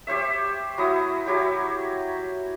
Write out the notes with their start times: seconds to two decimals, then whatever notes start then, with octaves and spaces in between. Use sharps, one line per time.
0.07 G4 C5 C#5 E5
0.78 F#3 E4 D#6
1.26 F#3 E4 G4 C#5